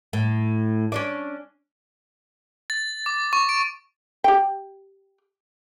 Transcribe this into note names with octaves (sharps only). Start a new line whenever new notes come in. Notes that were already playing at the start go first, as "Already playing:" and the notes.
A2
C#4 D4 D5
A6
D6
C#6
D7
G4 G5